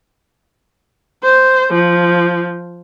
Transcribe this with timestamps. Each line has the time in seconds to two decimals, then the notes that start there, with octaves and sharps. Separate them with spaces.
1.23 C5
1.73 F3